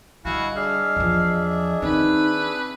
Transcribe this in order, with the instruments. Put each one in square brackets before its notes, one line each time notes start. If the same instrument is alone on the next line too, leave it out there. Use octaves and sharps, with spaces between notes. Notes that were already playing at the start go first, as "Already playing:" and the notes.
[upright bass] D3 G3 [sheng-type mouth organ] E4 F5 G#5 [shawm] F#4 [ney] D#5
[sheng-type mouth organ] D4 G#4 E5 [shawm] F5
[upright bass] E2 F3
[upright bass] D#3 C4 [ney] D#4 [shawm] B4
[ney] C4